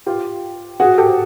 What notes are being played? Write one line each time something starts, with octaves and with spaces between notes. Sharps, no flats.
F4 G4
F#4 G#4
G4 A4